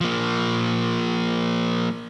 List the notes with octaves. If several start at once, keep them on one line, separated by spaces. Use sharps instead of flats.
F3 A#3